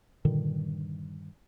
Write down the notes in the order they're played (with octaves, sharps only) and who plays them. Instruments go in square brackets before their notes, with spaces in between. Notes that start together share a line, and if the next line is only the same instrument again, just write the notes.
[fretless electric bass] G2 A#2 D3 D#3